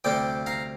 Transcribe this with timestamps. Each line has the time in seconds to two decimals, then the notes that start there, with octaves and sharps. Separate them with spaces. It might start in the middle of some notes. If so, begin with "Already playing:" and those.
0.04 D2 C3 G3 C4 D5 G5
0.46 F5 A#5